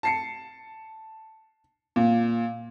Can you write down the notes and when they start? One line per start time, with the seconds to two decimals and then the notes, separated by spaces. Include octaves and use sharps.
0.03 A5 C7 C#7
1.96 A#2